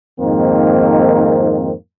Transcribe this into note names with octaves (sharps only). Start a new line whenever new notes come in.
F2 G#2 D#3 A#3 C4